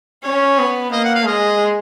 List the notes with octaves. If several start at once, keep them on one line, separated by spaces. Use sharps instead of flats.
C#4 C#5
B3
A#3 D#5
F#5
F5
G#3 D#5